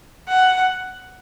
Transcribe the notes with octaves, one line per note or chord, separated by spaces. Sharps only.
F#5